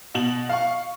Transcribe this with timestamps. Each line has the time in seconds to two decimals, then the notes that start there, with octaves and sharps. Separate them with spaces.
0.14 B2 F#7
0.49 F5 C#6